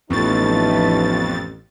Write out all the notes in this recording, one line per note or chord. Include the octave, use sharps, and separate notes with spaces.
A1 F2 A3 B3 D#4 B4 C#6 A6